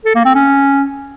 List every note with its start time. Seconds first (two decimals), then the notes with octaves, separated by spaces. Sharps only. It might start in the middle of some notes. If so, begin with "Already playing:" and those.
0.05 A4
0.15 A#3
0.25 C4
0.35 C#4